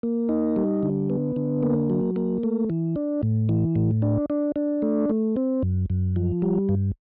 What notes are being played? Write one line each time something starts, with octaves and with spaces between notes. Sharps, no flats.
A#3
D#4
G3
D3
B3
D3
A#3
F#3
A#3
A3
E3
D4
A2
E3
A2
D4
D4
D4
A3
A3
C4
F#2
F#2
F3
G3
G2